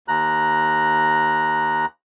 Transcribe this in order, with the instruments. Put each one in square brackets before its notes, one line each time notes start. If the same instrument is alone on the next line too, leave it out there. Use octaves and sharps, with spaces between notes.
[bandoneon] D#2 A#5 F#6